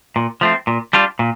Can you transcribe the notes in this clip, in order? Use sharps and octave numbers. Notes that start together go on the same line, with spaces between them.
A#2
F3 A3 C4
A#2
G3 D4 F4
A#2